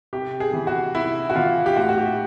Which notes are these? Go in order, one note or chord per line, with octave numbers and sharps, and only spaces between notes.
C3 G4
G#4
E3
F#4
C3 E4
F#4
E3 F4
G4
A2 F#4
F#4
G4